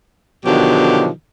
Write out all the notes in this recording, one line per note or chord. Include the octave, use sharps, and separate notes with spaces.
B2 D3 D#3 F3 F#3 G4